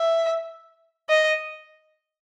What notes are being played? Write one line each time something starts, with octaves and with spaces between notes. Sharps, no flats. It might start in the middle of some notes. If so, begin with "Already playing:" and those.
Already playing: E5
D#5